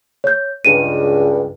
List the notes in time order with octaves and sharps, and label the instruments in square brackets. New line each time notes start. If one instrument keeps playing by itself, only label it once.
[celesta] C#5 G6
[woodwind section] C#2 G2 [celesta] D#7